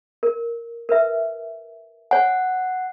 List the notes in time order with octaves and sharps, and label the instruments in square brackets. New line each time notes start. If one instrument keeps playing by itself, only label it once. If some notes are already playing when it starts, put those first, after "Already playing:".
[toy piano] A#4
A#4 B4 E5
[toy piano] C#5 G#5 [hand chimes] F#5